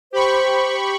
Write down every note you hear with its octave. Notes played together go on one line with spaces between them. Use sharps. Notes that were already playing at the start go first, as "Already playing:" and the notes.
G4 C5 B5 C#6